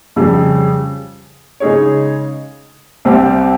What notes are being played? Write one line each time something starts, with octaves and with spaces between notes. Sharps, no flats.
F2 C#3 G3
C#3 G#3 D#4 G#4 C#5
C2 C3 G3 C4 G4